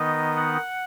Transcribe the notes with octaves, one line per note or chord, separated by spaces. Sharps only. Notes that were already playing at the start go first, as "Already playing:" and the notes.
Already playing: D#3 B3 D#4 D#5
F#5